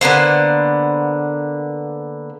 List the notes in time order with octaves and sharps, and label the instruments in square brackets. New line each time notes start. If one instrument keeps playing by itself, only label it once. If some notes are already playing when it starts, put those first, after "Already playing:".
[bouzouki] D3 A#3 B3 C5